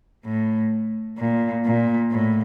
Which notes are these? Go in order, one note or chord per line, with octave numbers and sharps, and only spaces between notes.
A2
A#2
A#2
A2